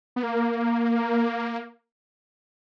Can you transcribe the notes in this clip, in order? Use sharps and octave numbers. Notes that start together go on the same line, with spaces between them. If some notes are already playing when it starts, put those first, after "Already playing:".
B3
A#3